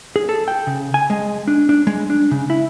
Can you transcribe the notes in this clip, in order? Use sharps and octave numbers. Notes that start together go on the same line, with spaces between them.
G#4
A4
G5
C#3
G#5
G#3
D4
D4
G#3
D4
C#3
E4